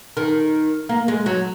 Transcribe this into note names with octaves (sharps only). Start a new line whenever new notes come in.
D#3
A#3
G#3
F#3